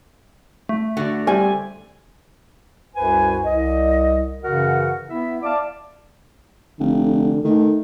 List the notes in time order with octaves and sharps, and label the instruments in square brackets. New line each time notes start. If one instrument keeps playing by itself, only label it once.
[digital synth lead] A3
[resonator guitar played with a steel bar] D3 [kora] F#4 D5
[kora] G3 C4 [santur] G#5
[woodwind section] C2 F#2 F#4 B4 C5 G#5
C2 D#5
F#2 C#3 E3 F#4 A#4 F#5
B3 E4 E5
D5 F5 A5 D6
[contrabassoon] F1 [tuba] D3
[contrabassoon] D#3 [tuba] A3